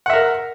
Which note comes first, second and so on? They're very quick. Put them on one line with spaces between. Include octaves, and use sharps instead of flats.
F#5 E5 A#4